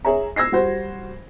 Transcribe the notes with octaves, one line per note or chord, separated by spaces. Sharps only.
G#4 C#5 E5 A#5
E6 G#6 A#6 C7
G3 F#4 C5